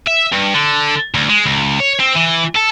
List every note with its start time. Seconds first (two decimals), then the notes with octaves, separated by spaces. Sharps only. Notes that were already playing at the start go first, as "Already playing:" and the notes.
0.07 E5
0.32 G2
0.54 D3
1.14 D2
1.29 G#3
1.46 C#2
1.80 C#5
2.00 C4
2.16 E3
2.56 A4